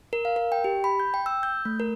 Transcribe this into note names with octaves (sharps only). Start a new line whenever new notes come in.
A#4
F5
A#4
G5
G4
B5
G6
G5
E6
G6
A3
A#4